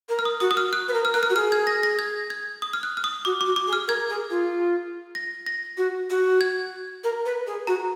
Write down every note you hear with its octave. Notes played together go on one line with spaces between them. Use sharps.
A#4
F6
D#6
F#4 D#6
D#6
F6
F#6
B4
A#4
F6
A#4 F#6
F6
F#4
G#4 F6
G#6
A#6
A#6
G#6
G#6
D#6
F6
F#6
F6
D#6
F#4 D6
D6
F#4
D6
G#4
F6
A#4 G#6
G#4
F4
A#6
A#6
F#4
F#4
G#6
A#4
B4
G#4
F#4 A#5